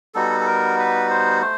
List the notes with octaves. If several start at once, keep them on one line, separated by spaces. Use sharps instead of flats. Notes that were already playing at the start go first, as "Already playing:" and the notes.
G3 B3 D#4 F#4 A4
A4
A#4
B4
C5
A3 C5